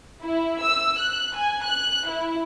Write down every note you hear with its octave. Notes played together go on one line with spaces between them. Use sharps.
E4
E6
F#6
G#5
F#6
E4